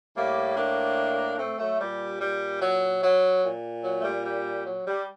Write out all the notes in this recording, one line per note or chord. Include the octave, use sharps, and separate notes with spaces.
A2 G3 A#3
A#3 D4
A3 C4
F#3 A3
A#2 G3
G3
F#3
F#3
A#2
F#3
A3
G3
G3
F#3
G3